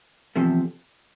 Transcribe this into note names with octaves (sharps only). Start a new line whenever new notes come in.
E2 C3 F3 A3